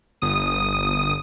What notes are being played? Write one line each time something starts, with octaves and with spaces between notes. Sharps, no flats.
G1 D#6 D#7